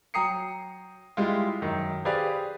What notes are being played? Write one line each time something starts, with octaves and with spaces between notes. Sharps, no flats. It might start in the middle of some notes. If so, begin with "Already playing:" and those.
F#3 G5 A#5 D#6 C7 C#7
G3 G#3 E4 F4
F#2 D#3
G4 G#4 B4 C5 D5 F5